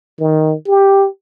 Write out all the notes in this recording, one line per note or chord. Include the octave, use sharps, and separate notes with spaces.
D#3
G4